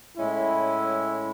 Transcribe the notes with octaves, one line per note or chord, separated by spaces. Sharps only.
A2 G#3 C#4 E4